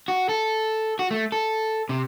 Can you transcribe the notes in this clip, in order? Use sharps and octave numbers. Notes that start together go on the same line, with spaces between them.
F#4
A4
F#4
A3
A4
C3